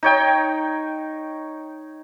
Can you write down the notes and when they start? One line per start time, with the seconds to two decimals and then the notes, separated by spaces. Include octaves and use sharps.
0.03 D#4 C#5 G5